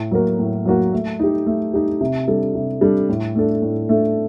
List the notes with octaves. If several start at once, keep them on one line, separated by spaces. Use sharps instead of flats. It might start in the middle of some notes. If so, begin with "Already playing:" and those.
Already playing: A2
F#3 A#3 F#4 A#4
A2
F#3 A#3 F#4 A#4
A3
D#4 G4
A3
D#4 G4
C3
G3 D4 A4
C3
G3 D4 A4
A2
A3 D4 A4
A2
A3 D4 A4